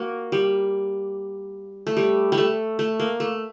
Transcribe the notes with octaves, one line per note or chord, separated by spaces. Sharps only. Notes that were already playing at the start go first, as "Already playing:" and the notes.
Already playing: A#3 F#4
G3
A3
G3
G3
A3
A3
A#3
A3